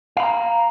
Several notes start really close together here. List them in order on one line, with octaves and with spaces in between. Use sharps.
F5 B5 A#5